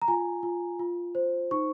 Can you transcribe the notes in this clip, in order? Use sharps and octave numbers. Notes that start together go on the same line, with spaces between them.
A#5
F4 G#5
F4
F4
C5
D#4 C#6